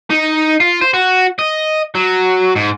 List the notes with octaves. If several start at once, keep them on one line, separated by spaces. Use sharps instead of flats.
D#4
F4
C5
F#4
D#5
F#3
G#2